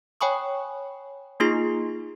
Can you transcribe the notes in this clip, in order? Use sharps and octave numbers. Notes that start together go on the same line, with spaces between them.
C#5 G5 G#5 B5 C#6 D#6
A#3 D#4 F4 G#4 C6 C7